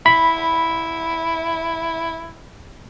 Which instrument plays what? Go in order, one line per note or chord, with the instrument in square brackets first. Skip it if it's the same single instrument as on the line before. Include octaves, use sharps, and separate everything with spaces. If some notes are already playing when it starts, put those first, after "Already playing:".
[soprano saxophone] E4 [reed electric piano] B5